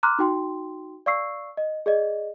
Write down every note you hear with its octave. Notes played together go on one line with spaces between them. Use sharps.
A#5 C6 D6 F6 F#6
D#4 F#4 G5 C6
D5 F5 C#6 E6 C7
D#5
G#4 D5 D#5